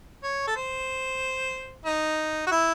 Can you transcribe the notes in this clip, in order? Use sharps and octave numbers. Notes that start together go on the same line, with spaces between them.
C#5
A4
C5
D#4
F#4
E4